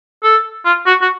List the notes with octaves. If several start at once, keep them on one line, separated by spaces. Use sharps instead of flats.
A4
F4
F#4
F#4